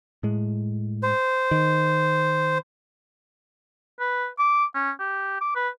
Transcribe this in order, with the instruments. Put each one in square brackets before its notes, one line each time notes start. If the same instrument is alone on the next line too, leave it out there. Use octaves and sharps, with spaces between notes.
[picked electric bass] A2 G#3
[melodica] C5
[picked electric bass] D#3
[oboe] B4
D6
C#4
G4
D6
B4